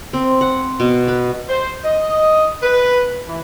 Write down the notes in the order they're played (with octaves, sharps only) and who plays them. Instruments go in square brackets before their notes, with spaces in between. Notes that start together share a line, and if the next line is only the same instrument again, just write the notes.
[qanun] C4
F#5
B2
B4
[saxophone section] C5
D#5
B4
E3